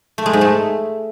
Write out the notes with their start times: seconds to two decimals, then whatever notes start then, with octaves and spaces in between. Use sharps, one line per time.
0.18 A3
0.26 G#3
0.33 G#2
0.41 A3